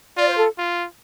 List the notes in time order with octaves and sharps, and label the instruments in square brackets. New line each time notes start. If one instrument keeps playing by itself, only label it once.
[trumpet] F4 [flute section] D5
[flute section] C5
A4
[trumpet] F4